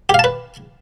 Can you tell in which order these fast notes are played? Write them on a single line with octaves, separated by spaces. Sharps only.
G4 F5 A5 B4